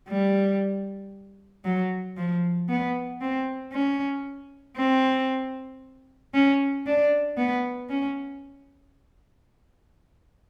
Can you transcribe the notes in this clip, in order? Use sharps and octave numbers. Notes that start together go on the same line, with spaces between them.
G3
F#3
F3
B3
C4
C#4
C4
C#4
D4
B3
C#4